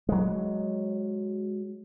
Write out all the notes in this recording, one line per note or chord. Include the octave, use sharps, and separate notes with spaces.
F#3 G#3